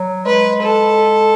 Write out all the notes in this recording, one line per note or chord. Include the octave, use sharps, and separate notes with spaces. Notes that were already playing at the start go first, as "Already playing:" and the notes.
Already playing: F#3
G#3 B4
A4